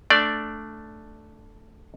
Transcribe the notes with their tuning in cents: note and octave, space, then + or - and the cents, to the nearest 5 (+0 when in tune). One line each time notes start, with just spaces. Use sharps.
A3 +0 D4 +0 D5 +0